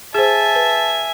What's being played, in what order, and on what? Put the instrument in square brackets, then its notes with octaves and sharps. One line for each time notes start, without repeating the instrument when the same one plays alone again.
[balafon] G#4 C5 [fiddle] E5 G#5 [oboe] A5
[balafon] B4